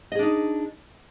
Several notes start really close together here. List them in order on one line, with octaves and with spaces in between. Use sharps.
D#5 G#4 D4 D#4